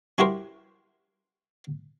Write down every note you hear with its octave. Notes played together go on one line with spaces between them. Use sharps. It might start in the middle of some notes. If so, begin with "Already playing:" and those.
C#4 E4 F#4 G4 A#4 C5